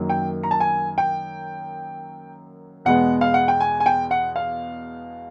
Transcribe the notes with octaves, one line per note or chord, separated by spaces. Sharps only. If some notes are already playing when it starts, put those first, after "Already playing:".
Already playing: F#2 D#3 F#3 A#3
G5
A#5
A5
G#5
G5
E2 B2 G#3 B3 F#5
F5
F#5
G5
G#5
G#5
G5
F#5
F5